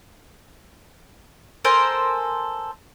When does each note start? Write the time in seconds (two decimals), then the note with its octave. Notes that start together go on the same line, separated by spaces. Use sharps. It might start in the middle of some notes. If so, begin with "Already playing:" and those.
1.65 A4 A#4 C5 G#5